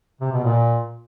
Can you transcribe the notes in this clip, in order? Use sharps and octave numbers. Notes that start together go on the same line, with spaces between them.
C3
B2
A#2